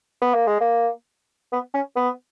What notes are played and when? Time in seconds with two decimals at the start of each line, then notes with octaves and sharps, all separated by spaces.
0.21 B3
0.34 A#3
0.47 G#3
0.60 A#3
1.52 B3
1.74 C#4
1.96 B3